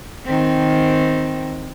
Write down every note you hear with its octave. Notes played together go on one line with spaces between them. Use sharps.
D#3 C4